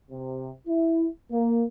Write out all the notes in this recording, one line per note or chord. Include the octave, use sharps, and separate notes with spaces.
C3
E4
A#3